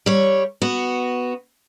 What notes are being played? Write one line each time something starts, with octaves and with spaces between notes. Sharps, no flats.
G3 C#5
B3 F#4